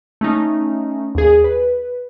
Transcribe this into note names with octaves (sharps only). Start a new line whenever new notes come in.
A3 C#4 D#4
D#2 G#4
B4